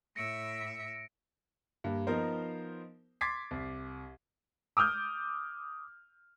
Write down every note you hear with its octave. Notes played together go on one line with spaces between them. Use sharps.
A2 E5 A#6 C#7 D7
G2 A#3
F3 B3 D#4 A#4 C5
C6 D6 G#6 A6 B6 C7
C2
D6 D#6 F6 G6